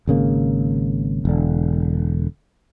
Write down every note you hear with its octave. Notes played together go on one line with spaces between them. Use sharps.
G#1 C#3 A#3
E1 D3